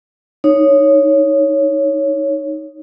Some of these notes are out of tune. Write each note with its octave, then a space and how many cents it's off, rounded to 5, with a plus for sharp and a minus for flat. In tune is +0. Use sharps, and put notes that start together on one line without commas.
D#4 -5 C#5 +0